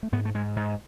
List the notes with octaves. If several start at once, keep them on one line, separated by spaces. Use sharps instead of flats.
A3
G#2 B3
A3
G#2 G#3
G#2